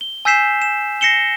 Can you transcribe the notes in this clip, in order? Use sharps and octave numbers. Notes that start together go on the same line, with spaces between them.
G7
G#5 E6 G6 B6 C7 E7
E7
A#6 C7 C#7 E7 G7